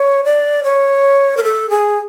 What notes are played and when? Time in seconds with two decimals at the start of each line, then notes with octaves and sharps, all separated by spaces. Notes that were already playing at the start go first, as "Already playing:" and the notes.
Already playing: C#5
0.24 D5
0.64 C#5
1.37 A#4
1.44 A4
1.70 G#4